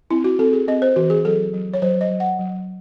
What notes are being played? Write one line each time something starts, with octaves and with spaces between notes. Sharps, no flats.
C4 E4
F#4
C4 A4
G#4
C4 D#5
C5
E3 F#4
G#4
F#3 A4
F#3
C#5
F#3 C5
D#5
F#3
F#5
F#3